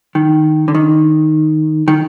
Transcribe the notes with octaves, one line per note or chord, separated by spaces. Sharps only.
D#3
D3
D#3
D#3